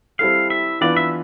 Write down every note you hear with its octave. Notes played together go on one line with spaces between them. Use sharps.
G3 C4 E4 A4 F5
E5
E3 B3 D4 F4 B4 D5
E5